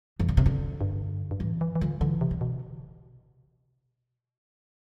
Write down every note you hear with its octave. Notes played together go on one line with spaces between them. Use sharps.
F2 E3
D3
C3
D3
G2
G2
A2 E3
E3
E3
D3 F3
D3 E3
C3
D3
B2